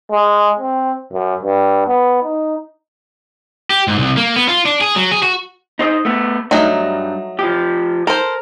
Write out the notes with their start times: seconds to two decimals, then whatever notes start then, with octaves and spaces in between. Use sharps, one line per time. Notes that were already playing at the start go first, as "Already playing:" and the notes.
0.11 G#3
0.59 C4
1.12 F#2
1.43 G2
1.87 B3
2.23 D#4
3.70 G4
3.88 G#2
3.99 C2
4.17 A#3
4.36 B3
4.48 F4
4.65 D4
4.81 G#4
4.96 F#3
5.12 G#4
5.23 F#4
5.79 D#4 C5 D#5
6.05 A3 B3
6.51 G2 F#3 A3 D#4
7.39 F3 G4
8.07 A4 A#4 C5